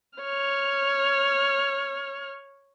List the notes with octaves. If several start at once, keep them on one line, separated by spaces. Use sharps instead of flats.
C#5 F6